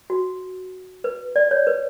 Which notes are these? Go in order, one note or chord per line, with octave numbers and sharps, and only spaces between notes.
F#4
B4
D5
C#5
B4